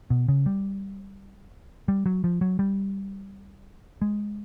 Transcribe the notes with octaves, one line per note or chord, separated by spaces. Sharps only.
B2
C#3
G3
G3
F#3
F3
F#3
G3
G#3